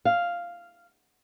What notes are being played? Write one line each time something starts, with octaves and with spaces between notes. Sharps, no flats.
F5